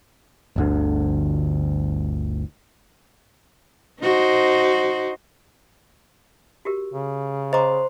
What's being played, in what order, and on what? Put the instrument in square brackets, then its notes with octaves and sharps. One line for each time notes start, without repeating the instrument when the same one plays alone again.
[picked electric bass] G1 D2 D3
[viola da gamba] D#4 F#4 C5
[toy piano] F#4 G4 A#4
[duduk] C#3
[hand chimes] C5 C6 [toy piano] D#5 A#5 D6